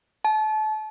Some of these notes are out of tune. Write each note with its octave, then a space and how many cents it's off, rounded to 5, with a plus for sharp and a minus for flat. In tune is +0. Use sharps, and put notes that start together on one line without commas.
A5 -30